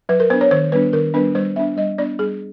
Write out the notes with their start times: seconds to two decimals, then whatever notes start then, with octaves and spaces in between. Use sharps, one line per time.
0.09 F#3 B4
0.20 A#4
0.30 B3 D4 C5
0.41 C#5
0.51 D#3 C5
0.72 G3 B3 D4 B4
0.93 D#3 A#4
1.14 G3 B3 D4 B4
1.35 G3 C5
1.56 B3 D4 E5
1.77 G3 D#5
1.98 B3 D4 D5
2.19 G3 G#4